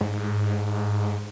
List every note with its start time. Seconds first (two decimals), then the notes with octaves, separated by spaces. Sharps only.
0.01 G#2